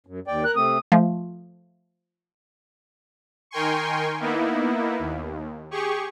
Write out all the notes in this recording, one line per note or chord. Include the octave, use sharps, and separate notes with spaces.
F#2
D#2 D5 G5
A#4 F#6
C3 A3 C4 D#6
F3 A3
D#3 A#4 G5 G#5 C6 C#6
A#3 B3 D#4 E4
D#2
G4 G#4 C#6